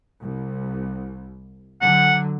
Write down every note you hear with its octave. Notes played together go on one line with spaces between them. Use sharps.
C2
D3 F#3 F#5